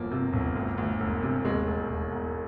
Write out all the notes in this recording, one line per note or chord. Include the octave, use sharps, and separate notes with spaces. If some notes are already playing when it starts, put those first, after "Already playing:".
Already playing: G1 F3 A#3
C3
G1
D2
D2
E1
C3
D#2 G#3
E1
E1
E1